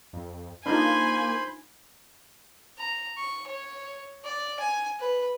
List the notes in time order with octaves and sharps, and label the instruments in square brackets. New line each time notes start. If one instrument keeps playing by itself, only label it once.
[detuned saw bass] F2
[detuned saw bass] A#3 [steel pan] D4 D#4 F4 [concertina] C5 B5 C6 [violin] G#5
[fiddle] A#5
C#6
C#5
D5
G#5
B4